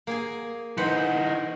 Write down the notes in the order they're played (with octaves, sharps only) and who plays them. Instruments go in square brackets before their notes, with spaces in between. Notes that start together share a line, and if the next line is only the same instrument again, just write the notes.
[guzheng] A#3 G#4 G#5
[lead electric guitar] E3 D#4 [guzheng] B4 C5 F#5